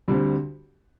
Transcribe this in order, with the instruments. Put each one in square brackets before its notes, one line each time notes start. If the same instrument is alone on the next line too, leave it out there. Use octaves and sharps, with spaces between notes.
[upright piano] D2 D3 G3 C4 G4